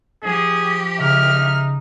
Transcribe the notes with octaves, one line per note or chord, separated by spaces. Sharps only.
F3 G4 G#4
C#3 D#4 E5 F6